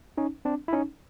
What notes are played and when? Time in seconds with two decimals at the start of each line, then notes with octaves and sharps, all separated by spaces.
0.17 C#4 D#4
0.45 C4 D4
0.68 E4
0.73 C#4 D#4